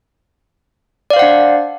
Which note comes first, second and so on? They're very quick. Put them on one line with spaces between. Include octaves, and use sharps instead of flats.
D5 F5 C5 F#5 D4